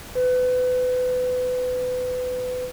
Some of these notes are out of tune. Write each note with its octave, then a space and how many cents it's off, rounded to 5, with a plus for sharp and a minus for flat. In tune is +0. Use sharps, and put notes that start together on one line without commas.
B4 +30